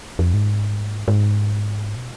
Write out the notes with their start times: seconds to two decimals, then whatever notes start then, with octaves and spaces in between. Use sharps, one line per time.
0.19 F2
0.34 G#2
1.08 G#2
1.96 B2